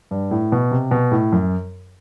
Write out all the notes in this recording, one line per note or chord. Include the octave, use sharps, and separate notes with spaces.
G2
A2
B2
C3
B2
A2
F#2